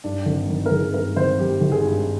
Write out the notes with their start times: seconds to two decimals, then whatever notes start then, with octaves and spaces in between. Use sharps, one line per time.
0.04 G2 D4
0.26 G#1
0.49 D#3
0.66 A#4
0.71 G#1 G#4
0.93 G2 A#4
1.16 G#1 C5
1.38 D#3 G4
1.61 G#1
1.72 G#4
1.83 G2